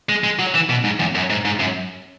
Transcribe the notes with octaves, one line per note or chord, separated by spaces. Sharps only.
G#3
G#3
F#3
E3
B2
G#2
E2
F#2
G#2
G#2
F#2